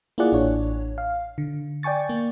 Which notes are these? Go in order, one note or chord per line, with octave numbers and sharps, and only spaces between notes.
A#3 E4 F4 G#4 D5 F#5
A1 D4 C#5
F5
D3
D5 G5 G#5 C#6 A6
A#3